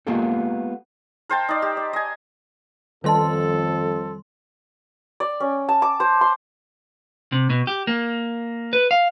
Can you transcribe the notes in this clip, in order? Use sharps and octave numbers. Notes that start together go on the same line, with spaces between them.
G#3 A#3 B3 F4 G4 A4
A#4 C5 G5 A5
D#4 D5
G4
D5
D#5 G#5
F2 D#3 G3 A4 B4 D#5 A5 C6
D5
C#4
A5
D6
C5
C6
C3
B2
G4
A#3
B4
F5